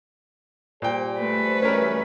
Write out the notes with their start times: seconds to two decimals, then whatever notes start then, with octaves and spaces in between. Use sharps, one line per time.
0.82 A#2 G3 G#4 C5 G5
1.19 A3 B4
1.62 F#2 E3 G3 C#4 A#4